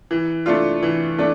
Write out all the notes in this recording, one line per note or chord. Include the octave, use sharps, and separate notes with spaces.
E3
A3 D4 F4
E3
A3 D4